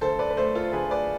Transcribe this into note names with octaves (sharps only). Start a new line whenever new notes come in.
D2 A4 C5
B4 D5
B4
A3 A4 C5
F4 A4
D2 G#4 B4
B4 D5